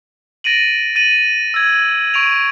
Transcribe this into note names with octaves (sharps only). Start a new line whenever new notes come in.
A6 A#6 D7 D#7 F#7
A6 D#7 F#7
E6 G#6
C#6 D7 F7